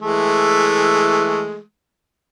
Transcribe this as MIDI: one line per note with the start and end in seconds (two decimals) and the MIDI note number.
0.02 1.61 52
0.02 1.61 56
0.02 1.61 57